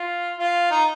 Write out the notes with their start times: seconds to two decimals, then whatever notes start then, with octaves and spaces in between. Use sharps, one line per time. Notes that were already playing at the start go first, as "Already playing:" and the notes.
Already playing: F4
0.39 F4
0.71 D#4